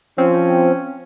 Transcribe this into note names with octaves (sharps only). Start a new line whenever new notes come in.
F3 C4 C#4